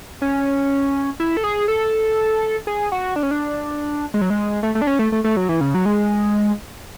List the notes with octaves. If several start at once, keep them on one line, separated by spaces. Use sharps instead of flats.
C#4
E4
A4
G#4
A4
G#4
F#4
D4
C#4
D4
G#3
F#3
G#3
A3
A3
D4
C#4
A3
A3
A3
F#3
E3
C#3
F#3
G#3